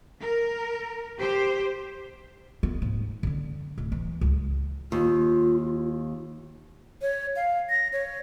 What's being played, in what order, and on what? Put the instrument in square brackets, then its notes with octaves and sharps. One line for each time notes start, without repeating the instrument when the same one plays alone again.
[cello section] A#4
G4 C5
[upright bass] B3
G#2
D3 C#4
D1
E3
C#2
[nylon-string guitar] D#2 [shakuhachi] F4
[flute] C#5
F5
A#6
C#5